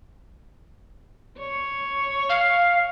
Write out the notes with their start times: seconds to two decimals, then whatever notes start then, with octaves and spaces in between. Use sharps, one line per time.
1.39 C#5
2.29 F5